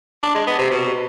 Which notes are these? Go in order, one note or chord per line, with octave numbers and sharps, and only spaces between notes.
D4
G#3
B3
C3
B2